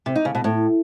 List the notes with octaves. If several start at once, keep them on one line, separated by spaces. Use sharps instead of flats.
C3
D#4
C#3
B2
A2